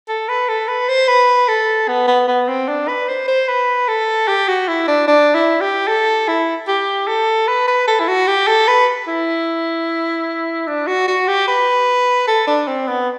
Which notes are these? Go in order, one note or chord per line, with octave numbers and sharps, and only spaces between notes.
A4
B4
A4
B4
C5
B4
A4
B3
B3
B3
C4
D4
B4
C5
C5
B4
A4
G4
F#4
E4
D4
D4
E4
G4
A4
E4
G4
A4
B4
B4
A4
E4
F#4
G4
A4
B4
E4
D4
F#4
F#4
G4
B4
A4
D4
C4
B3